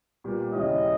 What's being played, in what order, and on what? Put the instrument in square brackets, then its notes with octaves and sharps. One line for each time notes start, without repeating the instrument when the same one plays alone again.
[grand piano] A#2 G3 B3 G4 A#4
[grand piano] D#2 C#3 G3 C#4 E4 [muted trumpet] D#5